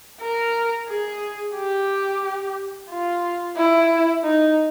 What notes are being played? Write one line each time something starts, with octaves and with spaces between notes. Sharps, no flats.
A#4
G#4
G4
F4
E4
D#4